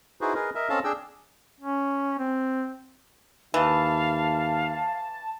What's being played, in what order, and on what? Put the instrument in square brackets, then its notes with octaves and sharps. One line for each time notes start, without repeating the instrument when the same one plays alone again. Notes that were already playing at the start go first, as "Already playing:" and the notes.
[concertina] D#4 E4 F#4 G#4 B4 C5
G#4 A#4 B4 D#5
A#4 D#5 E5
C4 C#4 A4 D#5 F5 A5
D4 G#4 G5 E6
[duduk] C#4
C4
[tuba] D#2 [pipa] E3 [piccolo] F5 [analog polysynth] A5